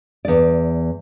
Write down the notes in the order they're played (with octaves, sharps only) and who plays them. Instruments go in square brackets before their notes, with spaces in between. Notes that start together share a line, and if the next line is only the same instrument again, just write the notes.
[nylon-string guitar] E2 D5